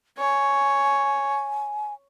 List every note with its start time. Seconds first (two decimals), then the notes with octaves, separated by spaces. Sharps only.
0.18 C#5 G#5